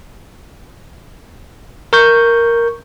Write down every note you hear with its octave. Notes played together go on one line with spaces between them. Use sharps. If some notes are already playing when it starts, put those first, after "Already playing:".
A#4 C#6 G6